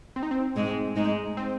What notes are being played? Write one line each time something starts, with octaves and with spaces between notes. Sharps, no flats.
C4
D#4
C4
G#2 G#3
G#2 G#3 D#4
C4